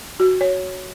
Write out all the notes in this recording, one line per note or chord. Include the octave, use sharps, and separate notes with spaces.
F#4
C#5